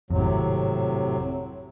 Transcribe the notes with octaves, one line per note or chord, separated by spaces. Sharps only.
G#1 F2 A2 C3 F#3